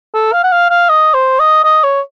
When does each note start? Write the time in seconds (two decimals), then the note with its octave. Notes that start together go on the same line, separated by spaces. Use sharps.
0.14 A4
0.32 F5
0.44 F#5
0.52 F5
0.70 F5
0.89 D#5
1.14 C5
1.39 D#5
1.64 D#5
1.84 C#5